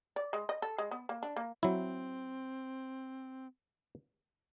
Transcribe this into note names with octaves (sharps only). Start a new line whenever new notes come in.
D5
G#3
D#5
A4
G#3
B3
A#3
D4
A#3
F#3 C4 E4